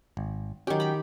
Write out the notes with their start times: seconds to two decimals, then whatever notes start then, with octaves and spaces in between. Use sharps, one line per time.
0.17 G#1
0.67 D#3 F#3 C#4 G4
0.80 A#5 B5